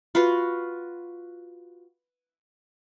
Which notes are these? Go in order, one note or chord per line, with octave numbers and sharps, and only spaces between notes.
F4 F#4 B4 F5